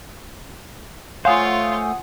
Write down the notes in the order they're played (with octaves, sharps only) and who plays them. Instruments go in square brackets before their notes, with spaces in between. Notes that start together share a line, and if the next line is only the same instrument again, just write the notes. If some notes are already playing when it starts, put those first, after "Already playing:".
[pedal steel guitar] A3 C5 [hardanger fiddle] F4 C#5 [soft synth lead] F5 [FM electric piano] F#5 G#5 D#6